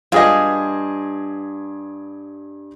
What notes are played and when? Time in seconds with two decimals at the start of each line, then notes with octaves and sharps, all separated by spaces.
0.12 G2 F4 G#4 D#5